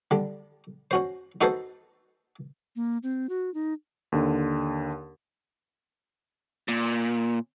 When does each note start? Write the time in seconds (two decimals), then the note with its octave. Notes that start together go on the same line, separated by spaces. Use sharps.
0.11 D3 G3
0.91 C#4 F#4 C5
1.41 D#4 F#4 G#4 A4 B4 C5
2.76 A#3
3.03 C4
3.29 F#4
3.54 D#4
4.12 D#2 D3
6.68 A#2